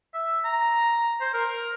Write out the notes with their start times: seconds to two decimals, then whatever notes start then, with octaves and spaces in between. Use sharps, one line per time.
0.14 E5
0.45 A#5
1.21 C5
1.34 A#4